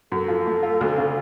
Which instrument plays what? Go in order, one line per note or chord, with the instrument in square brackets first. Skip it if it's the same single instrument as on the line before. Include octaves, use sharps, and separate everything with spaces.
[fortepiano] F#2 [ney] A4
[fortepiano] F3
A3
F4
D2
C#3